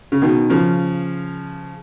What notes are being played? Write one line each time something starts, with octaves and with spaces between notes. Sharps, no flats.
C#3
B2 D#3
C#3 F3